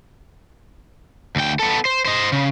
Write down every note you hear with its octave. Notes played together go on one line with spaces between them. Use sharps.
D2 G5
B3 A4
C5
C5 D#5
C#3